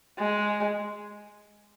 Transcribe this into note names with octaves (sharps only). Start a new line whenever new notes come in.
G#3